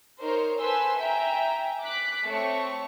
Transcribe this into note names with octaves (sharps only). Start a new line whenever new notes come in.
D#4 A#4 C5 C#5
A4 B4 C5 G#5 C6 E6
E5 G5 G#5 A#5
D6 F#6 B6
A3 C4 C#5 C#6